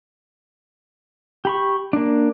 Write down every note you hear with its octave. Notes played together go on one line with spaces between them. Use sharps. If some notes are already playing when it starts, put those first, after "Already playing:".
G4 B5 C#6
A#3 D4